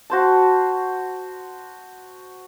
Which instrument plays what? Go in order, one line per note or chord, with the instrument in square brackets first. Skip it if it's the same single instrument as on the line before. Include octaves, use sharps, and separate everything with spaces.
[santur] F#4 C5 A5